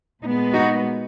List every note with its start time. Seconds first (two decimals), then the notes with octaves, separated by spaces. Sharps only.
0.23 A#2 G#3 B3 D#4
0.53 D#4 F#4